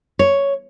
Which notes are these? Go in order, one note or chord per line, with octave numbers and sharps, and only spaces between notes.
C#5